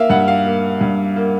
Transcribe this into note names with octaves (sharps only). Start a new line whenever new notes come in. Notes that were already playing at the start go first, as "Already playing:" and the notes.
Already playing: A#3 E5 F5
G2 F#5
F5
A#3
G2
A#3